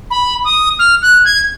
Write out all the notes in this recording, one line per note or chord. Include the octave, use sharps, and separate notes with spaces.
B5
D#6
F6
F#6
G#6